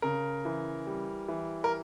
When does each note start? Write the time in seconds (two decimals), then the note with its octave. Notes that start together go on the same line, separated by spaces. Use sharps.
0.02 C#3 A#4
0.45 E3
0.87 G3
1.28 E3
1.64 A#4